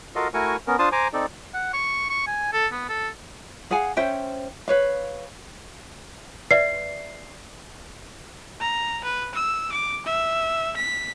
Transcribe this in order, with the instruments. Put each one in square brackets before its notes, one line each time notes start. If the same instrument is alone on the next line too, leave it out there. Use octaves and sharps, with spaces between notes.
[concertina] F4 F#4 A4 A#4 D#5 F5
A3 E4 F#4 A#4 G#5 C#6
B3 C#4 A#4
D4 F4 C5 A5 C6 D#6
C5 G#5 A#5 D6
C4 D#4 A4 D5
[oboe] F#5
C#6
C#6
G#5
A4
B3
A4
[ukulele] G#4 F5 F#5 G#5
C#4 C5 E5 G5
B4 C#5 F5
[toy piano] B4 D5 E5 [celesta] C7
[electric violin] A#5
B4
E6
D6
E5
B6